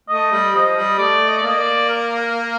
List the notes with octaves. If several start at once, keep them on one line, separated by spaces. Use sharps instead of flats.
A3 D#5
G3
F3 D#5
G3
A3 D5
D#5
D5
A#3 D#5
D5
A#4
A#4